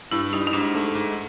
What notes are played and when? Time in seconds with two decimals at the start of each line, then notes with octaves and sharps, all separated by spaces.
0.12 G2 E4
0.33 G3 D#4
0.47 D#4
0.53 G#2 D4
0.75 A3
0.95 G#2